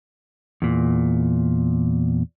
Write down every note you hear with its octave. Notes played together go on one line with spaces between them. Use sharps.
E2 A#2